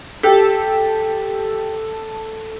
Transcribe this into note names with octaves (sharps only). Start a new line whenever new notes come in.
G4 A4 A5